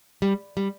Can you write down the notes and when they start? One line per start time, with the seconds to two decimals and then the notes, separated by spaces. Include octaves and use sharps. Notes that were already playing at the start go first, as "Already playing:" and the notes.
0.22 G3
0.57 G3